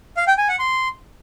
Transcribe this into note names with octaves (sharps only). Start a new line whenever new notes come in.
F5
G5
G#5
F#5
C6